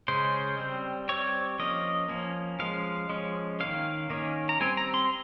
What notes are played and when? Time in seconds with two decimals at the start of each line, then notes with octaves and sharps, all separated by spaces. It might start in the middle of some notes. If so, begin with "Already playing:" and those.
0.08 C#3 G#3 C#4 C5
0.59 G3 C4
1.09 G3 C4 C#5
1.59 F3 A#3 C#4 D#5
2.09 F3 A#3 C#4
2.59 F3 G#3 C#4 F5
3.10 F3 G#3 C#4
3.60 D#3 A#3 C#4 F5
4.10 D#3 A#3 C#4
4.49 A#5
4.60 G3 C4 G#5
4.77 A#5
4.94 C6